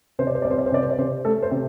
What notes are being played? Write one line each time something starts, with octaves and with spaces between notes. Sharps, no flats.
C3 C5
D5
C5
C2 D5
C5
D5
C5
C3 D5
C5
D5
C3 C5
A3 A4
C5
C3